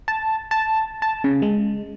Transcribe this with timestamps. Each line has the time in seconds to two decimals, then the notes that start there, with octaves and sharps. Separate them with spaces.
0.08 A5
0.51 A5
1.02 A5
1.24 C#3
1.42 G#3